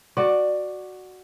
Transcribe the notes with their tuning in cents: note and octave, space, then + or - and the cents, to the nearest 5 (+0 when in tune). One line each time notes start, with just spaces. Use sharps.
F#4 +0 D5 +15